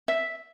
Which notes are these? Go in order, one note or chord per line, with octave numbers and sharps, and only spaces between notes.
E5